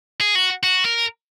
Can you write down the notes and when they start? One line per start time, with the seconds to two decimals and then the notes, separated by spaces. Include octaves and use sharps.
0.21 G#4
0.35 F#4
0.63 F#4
0.85 A#4